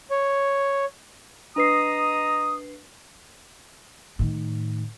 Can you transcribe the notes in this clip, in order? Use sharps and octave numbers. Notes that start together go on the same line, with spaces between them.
C#5
D4 B4 D#5 A#5 D#6 C7
A2 D#3